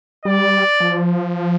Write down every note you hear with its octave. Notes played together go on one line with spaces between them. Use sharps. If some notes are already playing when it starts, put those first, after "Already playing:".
G3 D5
F3